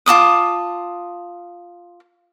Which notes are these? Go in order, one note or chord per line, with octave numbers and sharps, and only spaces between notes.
F4 A5 D6 D#6